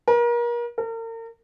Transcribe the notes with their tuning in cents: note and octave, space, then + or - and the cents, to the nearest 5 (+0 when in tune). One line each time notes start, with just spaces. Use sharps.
A#4 +35
A#4 -40